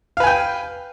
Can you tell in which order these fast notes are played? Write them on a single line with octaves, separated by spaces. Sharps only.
F5 B4 G#5 G5